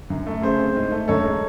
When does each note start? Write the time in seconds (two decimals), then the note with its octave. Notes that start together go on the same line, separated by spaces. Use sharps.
0.10 F#2
0.27 A3
0.42 C#3 G#4 C5
0.60 C4
0.76 G#2
0.92 A3
1.08 F#2 A4 C#5
1.24 G#3